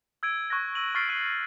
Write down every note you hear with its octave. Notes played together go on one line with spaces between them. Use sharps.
E6 G#6 D7 D#7
C#6 F#6 G#6 A#6
E6 D#7 F#7
C#6 F6 A6 B6 C7 D7
F#6 C7 D#7